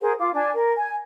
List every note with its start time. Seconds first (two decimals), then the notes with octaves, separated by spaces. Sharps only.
0.01 G#4 A#4 C5 F#5
0.19 F4 D6
0.34 D4 G#5
0.55 A#4
0.77 G#5